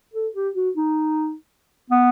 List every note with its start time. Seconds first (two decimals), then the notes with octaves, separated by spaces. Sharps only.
0.14 A4
0.35 G4
0.55 F#4
0.77 D#4
1.90 B3